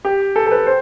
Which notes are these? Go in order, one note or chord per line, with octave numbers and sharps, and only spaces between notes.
G4
A4
A4
B4
C5